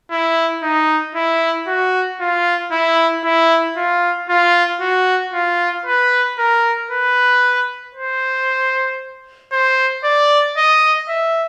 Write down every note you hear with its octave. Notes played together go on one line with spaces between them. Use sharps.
E4
D#4
E4
F#4
F4
E4
E4
F4
F4
F#4
F4
B4
A#4
B4
C5
C5
D5
D#5
E5